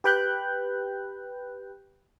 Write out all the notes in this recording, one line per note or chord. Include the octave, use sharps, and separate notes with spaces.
G4 B4 G5 B5 F#6 G6